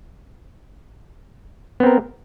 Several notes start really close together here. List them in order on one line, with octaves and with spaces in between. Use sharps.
B3 C4 A#4